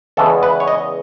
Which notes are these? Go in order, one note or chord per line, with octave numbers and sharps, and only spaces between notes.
E2 C#3 E3 G#3 B3 A4
B4
C#5
D#5